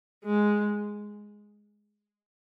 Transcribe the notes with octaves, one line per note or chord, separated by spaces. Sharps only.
G#3